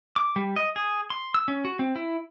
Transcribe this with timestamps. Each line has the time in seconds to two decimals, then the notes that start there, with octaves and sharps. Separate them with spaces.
0.16 D6
0.36 G3
0.56 D#5
0.76 G#4
1.10 C6
1.34 E6
1.48 C#4
1.65 F#4
1.79 C4
1.96 E4